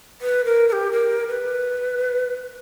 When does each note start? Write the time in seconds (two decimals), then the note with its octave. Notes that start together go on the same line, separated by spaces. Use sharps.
0.21 B4
0.45 A#4
0.68 A#4
0.73 G4
0.92 A#4
1.28 B4